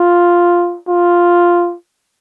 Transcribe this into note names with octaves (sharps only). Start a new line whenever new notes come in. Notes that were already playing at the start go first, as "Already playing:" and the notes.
Already playing: F4
F4